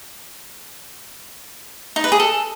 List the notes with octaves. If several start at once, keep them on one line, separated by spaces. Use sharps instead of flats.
D#4
B4
G#4
A4